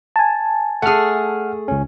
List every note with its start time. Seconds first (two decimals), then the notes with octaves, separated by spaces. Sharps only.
0.16 G#5 A5
0.82 A3 G#4 F#5 F6
1.68 C#2 C#4